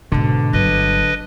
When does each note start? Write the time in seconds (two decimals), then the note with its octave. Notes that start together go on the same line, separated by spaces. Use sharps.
0.12 G#2 B2 D3
0.53 G1 F#3 B4 D#5